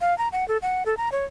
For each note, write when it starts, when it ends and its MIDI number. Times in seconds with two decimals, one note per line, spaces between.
0.01 0.17 77
0.18 0.28 82
0.32 0.47 78
0.48 0.57 69
0.62 0.83 78
0.86 0.97 69
0.97 1.11 82
1.12 1.25 73